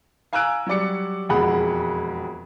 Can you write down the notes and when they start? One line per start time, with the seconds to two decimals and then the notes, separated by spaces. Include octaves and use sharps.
0.33 F5 G#5 A#5 E6 F#6 D7
0.67 F#3 G3 D5 C#7
1.29 E1 F2 G#3 G#4 F#5 B5